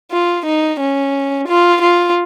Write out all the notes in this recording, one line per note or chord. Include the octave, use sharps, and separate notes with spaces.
F4
D#4
C#4
F4
F4